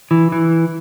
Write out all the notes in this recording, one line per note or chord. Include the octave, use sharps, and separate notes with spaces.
E3
E3